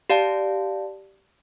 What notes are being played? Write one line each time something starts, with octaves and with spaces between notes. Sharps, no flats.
G4 D5 F5 A5